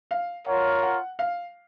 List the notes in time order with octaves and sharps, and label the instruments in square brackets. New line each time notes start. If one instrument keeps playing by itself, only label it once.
[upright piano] F5
[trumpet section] F4 A#4 C#5 [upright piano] F#5
[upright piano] F#5
F5